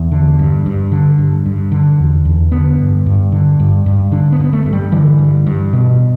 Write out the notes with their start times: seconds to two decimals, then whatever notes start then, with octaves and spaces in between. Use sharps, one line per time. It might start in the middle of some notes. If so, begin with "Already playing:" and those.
Already playing: E2 E3
0.12 D3
0.39 G2
0.66 G2
0.92 D3
1.18 G2
1.46 G2
1.72 D3
1.99 E2
2.25 E2
2.52 D3 B3
2.80 G2
3.06 G2
3.32 D3
3.60 G2
3.86 G2
4.12 D3 D4
4.32 B3
4.40 G2
4.44 B3
4.53 A3
4.66 G2
4.73 G3
4.92 D3 E3
5.19 G2
5.47 G2
5.73 B2